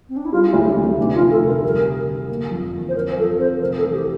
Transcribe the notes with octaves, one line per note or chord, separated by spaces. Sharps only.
C4
D4
E4
G3 F4
E4
D2
D4
D2
C4
E4
F1 D4
F4
F1
A4
C3 A#4
G3 A#4
D3
D3
A#3
F2
E3
C5
C4 A#4
F3 A4
C4 C5
F1 A#4
A4
E3
G4